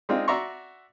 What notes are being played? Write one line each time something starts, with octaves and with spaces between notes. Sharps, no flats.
G#3 C4 D4 D#4 F4
F#4 D5 E5 A#5 C6 C#6